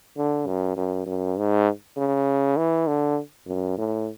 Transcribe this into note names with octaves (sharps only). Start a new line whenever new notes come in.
D3
F#2
F#2
F#2
G#2
C#3
E3
D3
F#2
A2